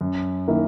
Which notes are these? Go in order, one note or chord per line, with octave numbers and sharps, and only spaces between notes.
F#2
D#3 A#3 E4